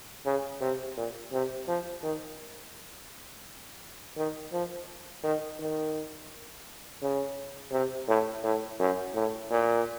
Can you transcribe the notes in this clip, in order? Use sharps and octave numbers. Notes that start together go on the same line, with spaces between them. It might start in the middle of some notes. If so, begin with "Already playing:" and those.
C#3
C3
A#2
C3
F3
D#3
D#3
F3
D#3
D#3
C#3
C3
A2
A2
F#2
A2
A#2